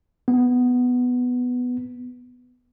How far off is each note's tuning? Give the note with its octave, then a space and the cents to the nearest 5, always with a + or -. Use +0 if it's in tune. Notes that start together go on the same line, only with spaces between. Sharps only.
B3 +5